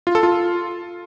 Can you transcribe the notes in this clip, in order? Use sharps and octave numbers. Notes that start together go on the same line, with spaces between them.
F4
A4
F4